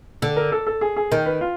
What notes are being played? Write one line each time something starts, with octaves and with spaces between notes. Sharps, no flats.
D3 A4
A#4
A4
A4
G#4
G#4
D#3 A#4
B4
F4